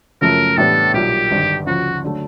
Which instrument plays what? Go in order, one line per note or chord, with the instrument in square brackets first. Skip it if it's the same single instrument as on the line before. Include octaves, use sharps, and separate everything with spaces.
[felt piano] F#2 C#3 F3 A3 [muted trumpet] A#4
[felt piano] A2 E3 G3 B3 D4 [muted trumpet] A4
[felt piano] B1 A#2 G3 [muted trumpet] G4
[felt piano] G#1 G2 D3
[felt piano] D2 C#3 F3 [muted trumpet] F#4
[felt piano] D3 F#3 A3